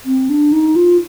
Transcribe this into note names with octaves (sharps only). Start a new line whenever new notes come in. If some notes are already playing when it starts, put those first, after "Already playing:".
C4
D4
D#4
F4